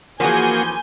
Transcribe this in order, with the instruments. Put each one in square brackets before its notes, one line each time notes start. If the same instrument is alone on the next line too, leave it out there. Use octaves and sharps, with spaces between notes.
[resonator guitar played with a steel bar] E3 F3 [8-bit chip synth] A#3 F#4 G#4 [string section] G#5 G6